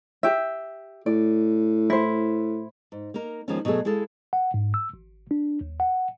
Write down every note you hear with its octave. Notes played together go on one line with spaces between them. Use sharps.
G4 E5
A2 D5
E4 C5
G#2
A#3 D#4 A#4
D#3 F3 G#3 A#3 B3 C#4
B2 F#3 A3 G#4 A4
G#3 E4 G#4 A4 F5
F#5
G#2
E6
G#1
D4
D#2
F#5